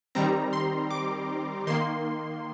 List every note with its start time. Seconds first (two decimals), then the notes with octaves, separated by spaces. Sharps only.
0.15 D#3 G3 C4 A#5
0.53 C6
0.91 D6
1.67 D#3 A#3 C6